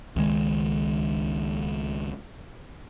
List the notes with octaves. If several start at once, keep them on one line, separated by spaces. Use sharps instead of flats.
C#2 D#3 G#3